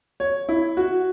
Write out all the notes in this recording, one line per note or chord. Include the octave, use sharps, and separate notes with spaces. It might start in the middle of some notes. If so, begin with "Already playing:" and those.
C#5
E4
F#4